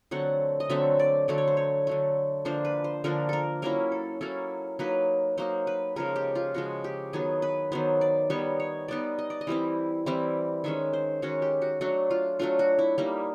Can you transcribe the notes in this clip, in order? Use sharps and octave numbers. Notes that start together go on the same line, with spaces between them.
D3 F#3 A3 C4 F#5
D#5
D3 F#3 A3 C4 E5
D5
D3 F#3 A3 D5
C#5
C5
C#5
D3 F#3 A3
D3 F3 A#3 D4 C5
B4
C5
D3 F3 A#3 D4 A#4
A4 A#4
F#3 A#3 C#4 E4 A#4
A4
F#3 A#3 C#4 E4 A4
F#3 A#3 D#4 B4
F#3 A#3 D#4 C5
B4
C#3 F3 G#3 A#4
G4
F4
C#3 F3 G#3 F#4
G4
D#3 F#3 B3 G#4
B4
D#3 F#3 B3 C5
D5
G3 B3 D#4 C#5
C#5
G3 B3 D#4 D5
D#5
D5
D#5
E3 G3 C4 E4
E3 G3 C4 E4
D#3 G#3 C#4 E5
C5
D#3 G#3 C#4 F#4
G4
F#4
F#3 A3 D4 F#4
F4
F#3 A3 D4 F4
F#4
E4
G3 A#3 D#4 E4